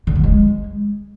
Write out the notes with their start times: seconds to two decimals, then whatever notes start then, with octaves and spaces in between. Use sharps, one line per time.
0.07 D3
0.15 G3
0.24 G#3